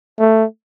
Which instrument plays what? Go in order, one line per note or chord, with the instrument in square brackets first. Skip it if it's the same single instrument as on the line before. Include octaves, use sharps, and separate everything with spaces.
[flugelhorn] A3